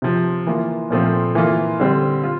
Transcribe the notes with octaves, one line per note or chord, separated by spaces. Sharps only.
C3 F3 C4
E3 A#3 F4
A#2 F3 A3 C4 F4
E3 A#3 F4
D3 G3 C4
F4